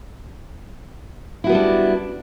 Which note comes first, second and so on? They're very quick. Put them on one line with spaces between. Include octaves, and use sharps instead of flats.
E4 F#4 B3 G3 D4